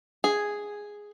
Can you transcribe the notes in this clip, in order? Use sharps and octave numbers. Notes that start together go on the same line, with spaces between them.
G#4